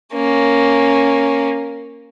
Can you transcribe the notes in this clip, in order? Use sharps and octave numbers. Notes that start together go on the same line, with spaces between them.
A#3 C#4